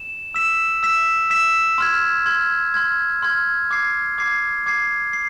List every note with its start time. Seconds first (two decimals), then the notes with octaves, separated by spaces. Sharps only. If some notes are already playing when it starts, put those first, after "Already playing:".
Already playing: E7
0.34 E6 B6 E7
0.83 E6 B6 E7
1.30 E6 B6 E7
1.78 C6 F6 G#6
2.26 C6 F6 G#6
2.74 C6 F6 G#6
3.22 C6 F6 G#6
3.71 D6 G#6 C7
4.18 D6 G#6 C7
4.66 D6 G#6 C7
5.13 C7